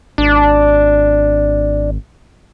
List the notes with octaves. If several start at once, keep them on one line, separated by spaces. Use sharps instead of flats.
G#1 D4